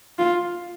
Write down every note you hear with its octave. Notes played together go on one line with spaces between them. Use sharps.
F4